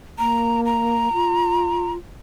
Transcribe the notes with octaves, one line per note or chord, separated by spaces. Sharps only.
A#3 A#5
A#5
F4